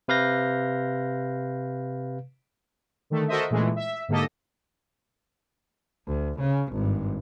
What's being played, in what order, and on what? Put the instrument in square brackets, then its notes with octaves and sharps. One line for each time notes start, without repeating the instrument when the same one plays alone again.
[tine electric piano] C3 B4 F5 G6 A#6
[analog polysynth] D3 D#3 A3
F#4 A4 A#4 C5 D#5 E5
A#2 C#3 E3 G#3 A3
E5
G#2 D3 A#3 G4 A4 D#5
[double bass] D2
C#3
G#1 G2